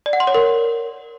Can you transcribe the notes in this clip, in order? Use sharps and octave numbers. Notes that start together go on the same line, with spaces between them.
D5
F#5
C6
C#5
A#4